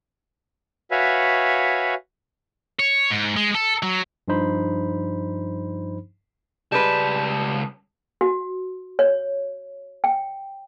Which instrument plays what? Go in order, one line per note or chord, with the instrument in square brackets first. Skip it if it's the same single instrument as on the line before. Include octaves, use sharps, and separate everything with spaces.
[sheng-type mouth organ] F#4 B4 C#5 E5 F5 G#5
[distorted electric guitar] C#5
G#2
G#3
A4
F#3
[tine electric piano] G2 F3 D4 D#4 C5 B5
[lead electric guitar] C#2 A5 [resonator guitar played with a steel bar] G3 G#3 B4
[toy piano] F#4
C#5
G5